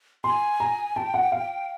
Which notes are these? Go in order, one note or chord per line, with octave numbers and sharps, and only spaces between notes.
G#5 C6
A#5
G5 A5
F#5
F5